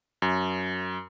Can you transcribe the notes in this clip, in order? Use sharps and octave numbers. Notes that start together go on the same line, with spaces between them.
F#2